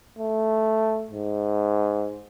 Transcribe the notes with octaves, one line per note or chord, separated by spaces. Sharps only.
A3
G#2